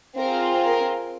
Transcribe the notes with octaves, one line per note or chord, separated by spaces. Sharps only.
C4 F4 G#4 A#4
A#4